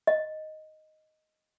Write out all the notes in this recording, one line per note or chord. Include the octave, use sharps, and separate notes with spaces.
D#5